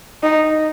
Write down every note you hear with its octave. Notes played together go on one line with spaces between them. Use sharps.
D#4